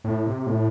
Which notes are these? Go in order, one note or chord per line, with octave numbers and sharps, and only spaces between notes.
A2
C3
A2